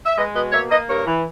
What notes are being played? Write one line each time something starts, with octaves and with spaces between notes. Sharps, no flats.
E5
G#3 B4 D#5
B2 B4 D#5
A#3 C#5 E5
A#3 B4 D#5
G2 A#4 C#5
E3